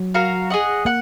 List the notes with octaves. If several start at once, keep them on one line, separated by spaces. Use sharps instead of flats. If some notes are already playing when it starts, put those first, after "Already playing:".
Already playing: F#3
F#4 A#4 F5
G#4 D#5 F#5
A#3 F#5